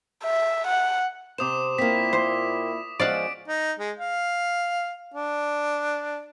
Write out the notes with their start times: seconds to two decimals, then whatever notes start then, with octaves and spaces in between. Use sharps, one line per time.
0.23 E5
0.67 F#5
1.38 C3 C5 D6 D#6 E7
1.78 A#2 A#3 C4 E4 B6
2.13 C5
3.00 F3 G#3 C#4 D5 F5 F#5 D7
3.48 D#4
3.79 G#3
3.99 F5
5.14 D4